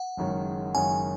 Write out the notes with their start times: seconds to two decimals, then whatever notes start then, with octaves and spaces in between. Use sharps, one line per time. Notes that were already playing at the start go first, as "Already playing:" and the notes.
Already playing: F#5
0.17 F#1 F#2 D#3 G#3 C#4
0.74 F#1 F#2 D#3 G#3 C#4 G#5